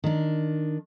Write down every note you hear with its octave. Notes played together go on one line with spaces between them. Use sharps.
D#3 D4